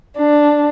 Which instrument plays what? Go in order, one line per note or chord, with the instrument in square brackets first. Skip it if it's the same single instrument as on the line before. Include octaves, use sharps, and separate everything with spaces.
[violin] D4